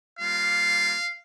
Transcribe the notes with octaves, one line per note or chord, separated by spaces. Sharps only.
G3 A#3 F4 F5